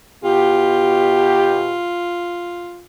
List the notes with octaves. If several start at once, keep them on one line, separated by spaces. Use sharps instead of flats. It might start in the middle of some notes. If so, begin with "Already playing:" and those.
B2 F4 G4